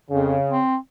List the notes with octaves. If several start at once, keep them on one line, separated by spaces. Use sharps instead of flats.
F2 C#3
C4